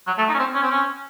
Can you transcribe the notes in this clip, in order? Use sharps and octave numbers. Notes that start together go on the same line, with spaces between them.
F#3
A3
D#4
C#4
C4
C#4
C4
C#4